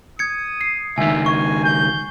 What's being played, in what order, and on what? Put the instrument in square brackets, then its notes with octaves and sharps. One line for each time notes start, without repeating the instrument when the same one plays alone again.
[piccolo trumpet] D#6 [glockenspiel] G#6 C#7
[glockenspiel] C7
[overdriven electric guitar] C#2 D#3 [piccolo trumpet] E5 [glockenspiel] G#5
[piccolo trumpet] G#5 [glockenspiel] C#6
[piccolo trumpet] G6